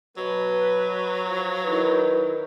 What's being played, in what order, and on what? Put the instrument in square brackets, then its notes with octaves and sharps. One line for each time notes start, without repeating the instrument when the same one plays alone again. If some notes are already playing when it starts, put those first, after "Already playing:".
[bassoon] B2 [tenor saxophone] F#3 [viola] B4
[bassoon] F3
[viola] D#3 E4 [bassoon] E3